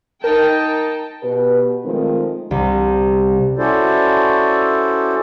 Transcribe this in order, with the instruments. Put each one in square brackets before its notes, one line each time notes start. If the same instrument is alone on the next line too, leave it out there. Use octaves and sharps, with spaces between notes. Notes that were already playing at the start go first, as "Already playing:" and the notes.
[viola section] D#4 G5 A5 [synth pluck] A#4
[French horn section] B2 G4 B4
D#3 F3 G#3 A3 C4 A#4
[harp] C2
[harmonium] C#4 E4 F#4 A4 C5 D5